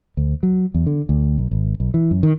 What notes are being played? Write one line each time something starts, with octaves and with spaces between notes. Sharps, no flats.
D2
F#3
E2
D3
D2
B1
G#1
B1
E3
F#2
D#3